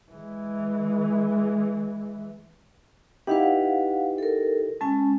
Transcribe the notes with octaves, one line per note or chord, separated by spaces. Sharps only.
E3 G#3
D#4 E4 G4 B4 F5 F#5
A4 A#4
G#3 C#4 G#5 A5